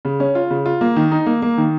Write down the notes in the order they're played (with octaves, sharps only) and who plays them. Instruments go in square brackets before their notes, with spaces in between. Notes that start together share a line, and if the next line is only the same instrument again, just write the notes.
[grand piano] C#3
C#4
F4
C#3
F4
A#3
D#3
D#4
A#3
A#3
D#3